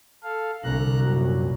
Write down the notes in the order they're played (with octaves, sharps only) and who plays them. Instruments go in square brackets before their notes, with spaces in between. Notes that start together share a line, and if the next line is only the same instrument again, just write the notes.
[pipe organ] A4 F5
[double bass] C2 [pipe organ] D3 A#5 F#6
[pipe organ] F#2 A#2 F#3